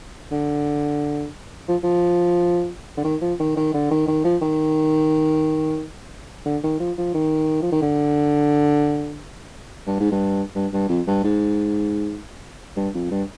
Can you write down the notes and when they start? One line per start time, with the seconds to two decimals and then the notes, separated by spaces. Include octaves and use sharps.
0.32 D3
1.68 F3
1.83 F3
2.97 D3
3.04 D#3
3.21 F3
3.40 D#3
3.57 D#3
3.74 D3
3.91 D#3
4.08 D#3
4.24 F3
4.42 D#3
6.45 D3
6.63 D#3
6.80 F3
6.97 F3
7.14 D#3
7.62 F3
7.72 D#3
7.82 D3
9.87 G2
10.00 G#2
10.12 G2
10.55 G2
10.73 G2
10.89 F2
11.07 G2
11.24 G#2
12.77 G2
12.94 F2
13.11 G2